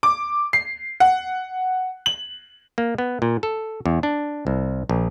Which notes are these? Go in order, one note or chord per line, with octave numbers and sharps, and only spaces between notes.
D6
C7
F#5
F#7
A#3
B3
A#2
A4
E2
D4
C2
A#1